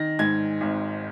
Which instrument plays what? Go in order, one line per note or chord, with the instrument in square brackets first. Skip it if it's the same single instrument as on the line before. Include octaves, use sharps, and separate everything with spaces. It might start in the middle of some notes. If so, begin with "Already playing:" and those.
Already playing: [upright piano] D#3 A#6
G#2 G#6
G#1